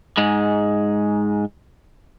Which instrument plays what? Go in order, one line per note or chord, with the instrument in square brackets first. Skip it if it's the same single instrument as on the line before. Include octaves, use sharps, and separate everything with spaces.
[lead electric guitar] G#2 G#3